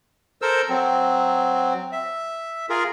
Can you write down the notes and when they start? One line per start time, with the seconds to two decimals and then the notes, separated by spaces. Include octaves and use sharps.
0.42 A4 A#4 C5 E6
0.69 F#3 C4
1.92 E5
2.70 F4 G#4 A#4